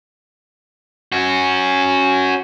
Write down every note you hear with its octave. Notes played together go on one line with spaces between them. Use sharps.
C#4 F#4